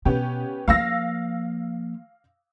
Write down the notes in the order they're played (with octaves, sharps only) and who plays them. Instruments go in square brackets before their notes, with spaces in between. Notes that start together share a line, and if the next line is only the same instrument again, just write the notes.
[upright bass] B2 [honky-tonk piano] B3 C#4 G4
[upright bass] F3 A#3 [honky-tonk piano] F5 E6 A#6